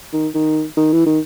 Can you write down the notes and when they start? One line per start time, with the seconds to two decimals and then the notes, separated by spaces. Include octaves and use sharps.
0.13 D#3
0.35 D#3
0.77 D#3
0.93 E3
1.06 D#3